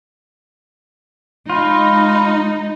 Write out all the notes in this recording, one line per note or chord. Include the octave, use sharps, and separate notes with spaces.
G#3 D#4 F4 B5